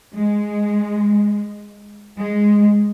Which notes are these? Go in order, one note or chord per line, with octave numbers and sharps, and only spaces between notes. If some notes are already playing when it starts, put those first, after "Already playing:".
G#3
G#3